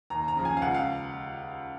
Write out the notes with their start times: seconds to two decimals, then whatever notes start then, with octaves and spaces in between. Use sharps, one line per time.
0.10 D#2 A#5
0.28 A#5
0.36 C#3 F3
0.45 G#5
0.57 F5
0.62 C#2 F#5
0.74 F5